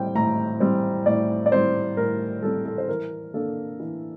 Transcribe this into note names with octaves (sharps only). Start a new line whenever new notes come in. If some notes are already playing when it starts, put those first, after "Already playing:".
Already playing: A2 G3 C4 G5
A2 A#5
G3 C4
A2 D5
D5
G3 C4 C5
A2 A#4
G3 C4 A4
A4
C5
E3 A#4
A#3 D4 A4
E3